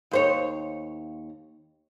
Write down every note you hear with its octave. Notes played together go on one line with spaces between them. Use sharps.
D#2 C5 C#5